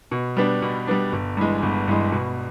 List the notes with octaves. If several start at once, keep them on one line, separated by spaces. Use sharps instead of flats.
B2
G3 B3 D4
B2
G3 B3 D4
G1
G2 E3 G#3
G1
G2 E3 G#3
B2